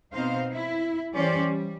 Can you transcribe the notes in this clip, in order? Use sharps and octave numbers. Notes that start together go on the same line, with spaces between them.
B2 C4 D#4 C5 F5
E4
E3 G3 C#4 G4 C5 D5
G3